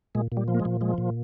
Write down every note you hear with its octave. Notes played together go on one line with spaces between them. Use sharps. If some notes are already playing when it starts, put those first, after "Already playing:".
A#2 G#3
A#2
G3
F3
A#3
G#3
A#2
F3 G#3
A#2